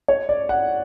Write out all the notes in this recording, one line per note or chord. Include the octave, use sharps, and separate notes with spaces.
C#5
D5
F#5